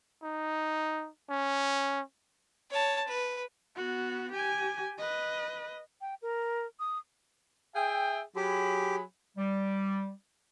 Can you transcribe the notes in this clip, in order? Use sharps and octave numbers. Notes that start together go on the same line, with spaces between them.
D#4
C#4
C#5 A5
B4
B3 F#4
G4 G#5
B4 D#5
G5
A#4
D#6
G#4 E5 G5
F#3 G4 G#4 B5
G3